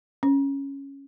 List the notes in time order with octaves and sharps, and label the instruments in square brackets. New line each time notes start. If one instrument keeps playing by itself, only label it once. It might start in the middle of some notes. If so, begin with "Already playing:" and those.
[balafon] C#4